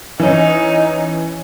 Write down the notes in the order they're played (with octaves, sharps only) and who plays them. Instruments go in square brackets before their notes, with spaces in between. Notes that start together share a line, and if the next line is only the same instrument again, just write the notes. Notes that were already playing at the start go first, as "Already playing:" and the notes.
[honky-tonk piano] E3 C#4 [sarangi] D#4